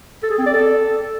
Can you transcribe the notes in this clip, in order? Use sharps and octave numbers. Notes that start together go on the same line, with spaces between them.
A4
G#4
C4
D5
A4